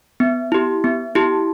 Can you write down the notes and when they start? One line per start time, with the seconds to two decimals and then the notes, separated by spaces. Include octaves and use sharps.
0.20 B3
0.52 E4 G4
0.84 B3
1.15 E4 G4